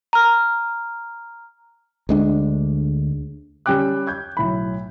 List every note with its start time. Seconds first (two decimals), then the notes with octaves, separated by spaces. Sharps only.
0.13 A#5 F6
2.09 D2 G#3 D4
3.66 G3 C#4 G5 D6 F#6
4.07 G6 G#6
4.37 B1 A2 B5